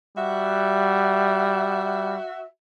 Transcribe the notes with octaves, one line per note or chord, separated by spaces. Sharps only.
G3 F#4 E5